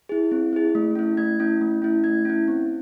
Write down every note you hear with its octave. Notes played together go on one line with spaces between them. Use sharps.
E4 G#4
C4
E4 G#4
A3
C#4 E4
A3 G#6
C#4 E4
A3
C#4 E4
A3 G#6
C#4 E4
C4